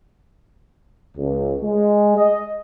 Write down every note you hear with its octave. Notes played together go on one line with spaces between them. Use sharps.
C#2
G#3
D#5